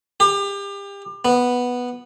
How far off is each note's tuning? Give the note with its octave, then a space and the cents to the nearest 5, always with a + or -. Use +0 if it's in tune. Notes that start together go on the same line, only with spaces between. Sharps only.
G4 +30
B3 -5